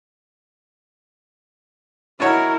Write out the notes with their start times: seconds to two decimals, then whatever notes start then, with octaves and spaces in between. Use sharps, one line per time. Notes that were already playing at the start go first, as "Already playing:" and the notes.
2.20 B2 E4 F#4 A#4 C#5